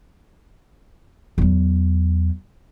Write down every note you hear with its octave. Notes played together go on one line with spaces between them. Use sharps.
E2 F#3